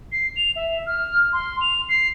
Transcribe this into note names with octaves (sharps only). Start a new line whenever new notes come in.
C7
F7
E5
F6
C6
F7
C7